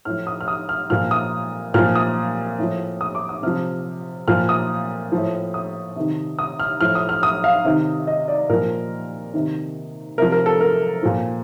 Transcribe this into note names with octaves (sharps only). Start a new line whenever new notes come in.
A2 F3 F6
D#6
F6
D#6
F6
A#2 F3 F6
D#6
A#2 F3 F6
D#6
A2 F3
D#6
D6
D#6
C3 F3 F6
A#2 F3 F6
D#6
A2 F3
D#6
C3 D#3
D#6
F6
A2 F3 F6
D#6
F6
D#6
F5
C3 D#3
D#5
D5
A#2 F3 A#4
C3 D#3
C3 F3 A#4
A#4
A4
A#4
A#2 F3